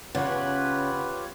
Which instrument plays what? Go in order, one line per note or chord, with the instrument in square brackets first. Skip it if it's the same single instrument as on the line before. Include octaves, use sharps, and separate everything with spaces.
[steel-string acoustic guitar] C#3 [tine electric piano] C#4 F#5 [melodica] F4 G4 C#5 [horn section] B4